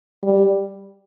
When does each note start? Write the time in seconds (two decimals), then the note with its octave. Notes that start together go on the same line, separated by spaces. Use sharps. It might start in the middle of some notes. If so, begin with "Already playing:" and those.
0.23 G3